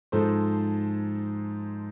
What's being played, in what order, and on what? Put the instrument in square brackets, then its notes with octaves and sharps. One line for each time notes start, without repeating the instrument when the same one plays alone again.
[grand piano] G#2 F3 G#3 A4 C5